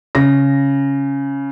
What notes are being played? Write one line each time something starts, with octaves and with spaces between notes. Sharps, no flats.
C#3 A#6